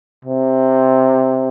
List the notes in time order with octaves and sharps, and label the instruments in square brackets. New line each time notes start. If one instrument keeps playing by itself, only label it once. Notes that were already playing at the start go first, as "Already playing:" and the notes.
[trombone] C3